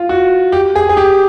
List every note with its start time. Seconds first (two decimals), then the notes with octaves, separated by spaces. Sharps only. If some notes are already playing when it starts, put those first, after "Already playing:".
Already playing: F4
0.09 F#4
0.52 G4
0.76 G#4
0.89 G#4
0.97 G4